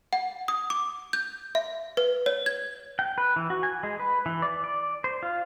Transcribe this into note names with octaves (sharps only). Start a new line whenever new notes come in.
F#5
D#6
D6
G6
E5
B4
C#5
G#6
G5
B4
E3
F#4
G#5
G#3
B4
E3
D5
D5
C5
F4